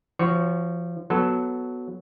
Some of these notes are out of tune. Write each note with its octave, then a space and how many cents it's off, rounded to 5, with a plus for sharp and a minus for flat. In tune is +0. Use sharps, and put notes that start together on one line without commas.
F3 -25 F#4 +0 C#5 +0
F#3 +0 B3 +0 A4 +0